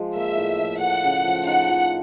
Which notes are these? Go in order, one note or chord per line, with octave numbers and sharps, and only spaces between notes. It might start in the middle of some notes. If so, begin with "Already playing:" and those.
Already playing: F3 G#3
A#3 E5
A2
F3
A3 F#5
C#3
F3
D#4 F#5
F3